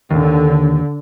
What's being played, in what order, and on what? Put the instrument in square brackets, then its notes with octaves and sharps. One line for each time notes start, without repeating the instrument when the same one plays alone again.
[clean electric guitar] D#2 [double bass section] D3